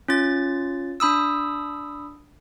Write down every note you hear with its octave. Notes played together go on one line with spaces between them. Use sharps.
C#4 F4 A6
D4 B5 D#6 E6